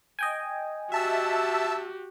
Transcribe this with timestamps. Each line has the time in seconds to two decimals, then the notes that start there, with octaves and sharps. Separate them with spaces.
0.19 D#5 G5 G#5
0.92 F#4 G4 E5 A5 E6